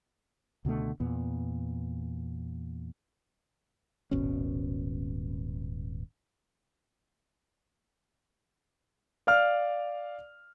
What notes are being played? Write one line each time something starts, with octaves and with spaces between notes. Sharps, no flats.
C#2 B2 D3 A3
E2 A#2 B3
D#1 G#1 B2 C#4
D5 F5 F6